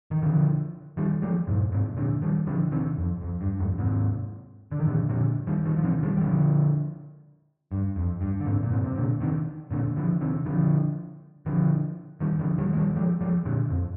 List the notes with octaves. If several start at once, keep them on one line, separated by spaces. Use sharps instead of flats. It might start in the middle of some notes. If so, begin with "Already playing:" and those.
D#3
D3 F3
D#3 G3
F3 G#3
G2 A#2
G#2 C3
A#2 D3
D#3 G3
D3 F3
C3 D#3
F2
F2
G2
F2 G#2
G#2 C3
D3
D#3
A#2 D3
A#2 D3
D#3 G3
D#3 G3
F3
C3 D#3
D#3 G3
G3
D3 F3
G2
F2
G2
D3
G#2 C3
A#2
G#2 C3
C3
A#2 D3
C3 D#3
A#2 D3
D3 F3
C3 D#3
D3 F3
D3 F3
D#3 G3
D3 F3
D#3 G3
G#3
D#3 G3
F3 G#3
F3 G#3
A#2 D3
F2